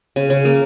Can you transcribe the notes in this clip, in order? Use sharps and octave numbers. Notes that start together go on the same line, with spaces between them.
C#3
C#3
A#3